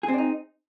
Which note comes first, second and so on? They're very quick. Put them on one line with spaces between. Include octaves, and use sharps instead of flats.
G#4 C4 D4 D#4